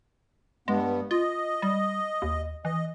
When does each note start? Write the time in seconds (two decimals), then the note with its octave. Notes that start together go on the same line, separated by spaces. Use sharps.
0.68 G2 G#3 B3
1.11 F4 D#5
1.62 G3
2.22 D#2
2.65 E3 D#5